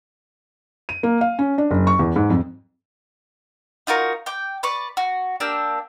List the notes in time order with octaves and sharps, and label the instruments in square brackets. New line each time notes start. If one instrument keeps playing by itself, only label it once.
[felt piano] D#7
A#3
F5
C#4
D4
F#1
C#6
E2
G#2
F2
[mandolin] D#4 F4 F#4 A#4
G5 D6
B4 D5 C#6
F#4
A#3 D4 G4 E6